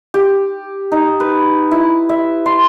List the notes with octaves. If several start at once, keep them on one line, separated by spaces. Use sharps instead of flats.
G4
D#4
B4
E4
E5
C6